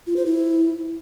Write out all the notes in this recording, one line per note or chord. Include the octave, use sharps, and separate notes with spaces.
F4
C5
E4